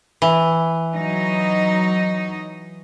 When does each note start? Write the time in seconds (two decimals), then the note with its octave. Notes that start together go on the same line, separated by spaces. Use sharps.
0.22 E3
0.94 F#3 D#4 D#5